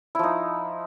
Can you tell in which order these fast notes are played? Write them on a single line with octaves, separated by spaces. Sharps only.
E4 F3 D#4